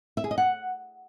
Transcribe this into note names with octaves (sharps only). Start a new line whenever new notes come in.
E5
G#4
D#5
F#5